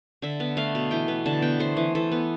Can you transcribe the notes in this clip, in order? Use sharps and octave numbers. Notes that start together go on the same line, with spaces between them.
D3 E5
B3
A3 F5
B2
E3 G5
B3
D3 A5
B3 G5
A3 C5
E3
E3 A4
B3